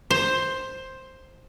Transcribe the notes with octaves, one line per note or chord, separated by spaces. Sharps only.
C5